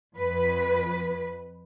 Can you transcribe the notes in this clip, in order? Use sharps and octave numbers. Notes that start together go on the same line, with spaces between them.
F2 B4